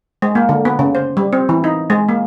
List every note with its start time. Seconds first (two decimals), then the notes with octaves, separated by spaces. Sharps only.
0.22 G#3
0.35 A#3
0.49 D3
0.65 B3
0.79 C#3
0.95 C5
1.17 G3
1.33 C4
1.49 E3
1.64 D#4
1.90 G#3
2.09 A#3